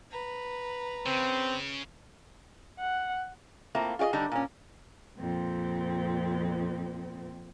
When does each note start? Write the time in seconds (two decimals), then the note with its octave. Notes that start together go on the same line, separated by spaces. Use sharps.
0.11 B4 A#5
1.06 C#3 C4
2.80 F#5
3.75 A3 A#3 C4 E4 F4
3.99 F4 G#4 D5 D#5
4.13 D3 G3 D4 D#4
4.32 A#2 C#4
5.18 F2 A#2 C4